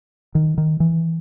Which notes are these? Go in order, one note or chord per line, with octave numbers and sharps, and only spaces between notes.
D#3
D#3
E3